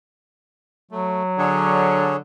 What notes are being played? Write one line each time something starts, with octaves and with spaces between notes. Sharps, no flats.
F#3 A3
D3 G#4 C#5